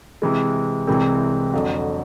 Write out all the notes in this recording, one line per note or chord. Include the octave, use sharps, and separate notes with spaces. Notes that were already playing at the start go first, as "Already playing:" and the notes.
C3 E3 G#3
C2 C3 E3 G#3 C4
F2 D3 F#3